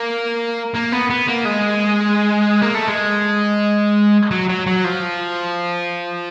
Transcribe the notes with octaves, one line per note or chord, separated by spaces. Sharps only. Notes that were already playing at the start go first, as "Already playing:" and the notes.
Already playing: A#3
A#3
B3
B3
A#3
G#3
A#3
A3
G#3
F#3
F#3
F#3
F3